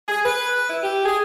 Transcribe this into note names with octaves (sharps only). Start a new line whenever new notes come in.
G#4
B4
E4
G4
G#4